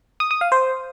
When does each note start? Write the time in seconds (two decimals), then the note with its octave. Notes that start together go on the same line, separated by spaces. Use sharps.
0.20 D#6
0.31 D#6
0.41 F5
0.52 C5